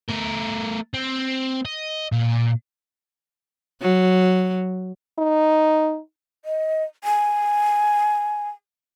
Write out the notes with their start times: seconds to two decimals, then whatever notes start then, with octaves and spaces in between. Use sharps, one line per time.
0.09 A3 A#4
0.94 C4
1.65 D#5
2.12 A#2
3.82 F#3
5.19 D#4
6.45 D#5
7.04 G#5